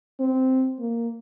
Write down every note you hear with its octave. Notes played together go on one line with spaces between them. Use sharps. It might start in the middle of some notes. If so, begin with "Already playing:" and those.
C4
A#3